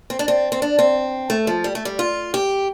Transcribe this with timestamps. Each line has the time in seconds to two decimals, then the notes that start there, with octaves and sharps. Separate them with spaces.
0.10 C4
0.19 D4
0.28 C4
0.52 C4
0.62 D4
0.79 C4
1.30 A3
1.47 F3
1.64 G3
1.75 A3
1.85 G3
1.99 F4
2.34 G4